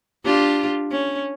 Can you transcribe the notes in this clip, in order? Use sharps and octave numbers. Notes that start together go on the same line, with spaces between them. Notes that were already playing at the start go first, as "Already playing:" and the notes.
D4 F4 G4
C#4